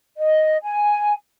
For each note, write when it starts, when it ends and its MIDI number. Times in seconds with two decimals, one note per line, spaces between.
0.17 0.57 75
0.63 1.13 80